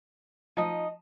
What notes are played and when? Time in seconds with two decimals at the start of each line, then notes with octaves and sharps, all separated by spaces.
0.57 F3 D#4 D#5